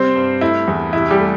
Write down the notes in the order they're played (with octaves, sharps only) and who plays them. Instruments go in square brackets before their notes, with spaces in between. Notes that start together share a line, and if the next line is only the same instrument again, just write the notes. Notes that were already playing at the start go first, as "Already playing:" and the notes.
Already playing: [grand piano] C3 G3 C4 C5
G2
A3 E4
E2
C3 E4
G3 G4
A3